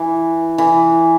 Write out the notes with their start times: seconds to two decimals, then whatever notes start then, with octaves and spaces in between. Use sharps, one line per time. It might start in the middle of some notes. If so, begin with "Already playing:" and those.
Already playing: E3
0.58 E3